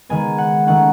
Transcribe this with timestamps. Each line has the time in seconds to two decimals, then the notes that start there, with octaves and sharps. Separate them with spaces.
0.09 D#3 G#3 B3 G#5
0.38 F#5
0.67 D#3 A3 C#4 F#5